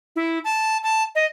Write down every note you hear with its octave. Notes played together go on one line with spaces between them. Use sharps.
E4
A5
A5
D#5